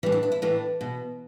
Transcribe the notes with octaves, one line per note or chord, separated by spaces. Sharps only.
A2 E3 G3
D4
D4
E4
A2 E3 D4
B2